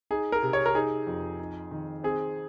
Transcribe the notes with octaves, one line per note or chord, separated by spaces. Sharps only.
D#4 G#4
A#4
C3
C#5
A#4
D#4 G#4
F2
D#4
D#3
C4 G#4